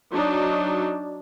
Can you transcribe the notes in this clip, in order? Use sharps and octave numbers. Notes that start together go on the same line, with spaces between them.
F#3 D4 D#4